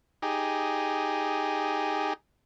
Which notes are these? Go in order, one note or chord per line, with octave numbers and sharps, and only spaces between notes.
D#4 G4 G#4